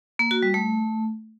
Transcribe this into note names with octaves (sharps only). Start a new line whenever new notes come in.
A#3
F#4
G3
A3